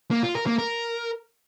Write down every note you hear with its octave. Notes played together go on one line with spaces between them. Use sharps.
A#3
F4
A#4
A#3
A#4